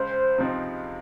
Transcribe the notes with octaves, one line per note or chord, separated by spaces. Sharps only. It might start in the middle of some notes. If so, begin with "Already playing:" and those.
Already playing: C#2 C5
C3 F3 C4 D#4